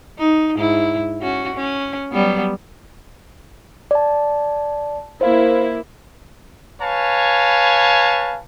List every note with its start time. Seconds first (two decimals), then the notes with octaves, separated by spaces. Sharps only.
0.19 D#4
0.56 G#2 E4
1.22 C#4 F#4
1.55 C#4
2.12 F#3 G3 B3
3.91 D5 A5
5.21 A#3 E4 C5 F5
6.81 B4 C#5 F5 G#5 A5